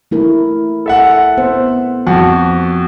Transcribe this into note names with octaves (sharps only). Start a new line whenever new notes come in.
A3 E4 A#4
A4 E5 F#5
B3 C5
F2 F#4 A5